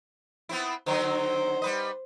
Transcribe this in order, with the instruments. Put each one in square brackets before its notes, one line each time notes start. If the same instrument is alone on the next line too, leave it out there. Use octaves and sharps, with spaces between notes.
[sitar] B3 C4 E4
[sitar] D3 D#3 F#3 [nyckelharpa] C5
[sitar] G3 B4 D#5